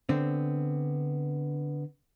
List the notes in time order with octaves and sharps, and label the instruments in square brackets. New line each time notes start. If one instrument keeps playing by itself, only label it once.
[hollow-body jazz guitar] D3 B3 C4